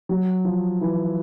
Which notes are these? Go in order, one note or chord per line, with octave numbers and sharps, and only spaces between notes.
F#3
F3
E3